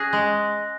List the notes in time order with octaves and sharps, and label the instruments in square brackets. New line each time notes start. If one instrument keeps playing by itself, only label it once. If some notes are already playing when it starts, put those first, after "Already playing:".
Already playing: [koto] C#4 G#4 [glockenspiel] F#6 A#6
[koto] G#3